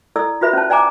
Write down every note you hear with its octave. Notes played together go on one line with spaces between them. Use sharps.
E4 A4 D5 E6
F4 F#4 B4 E5 B5
C#4 C5 A5
D5 G5 G#5 A#5 D6